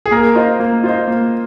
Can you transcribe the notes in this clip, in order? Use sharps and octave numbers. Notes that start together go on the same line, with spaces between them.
G#4
A#3 A#4
F4 C5 D#5
A#3
F4 C5 D#5
A#3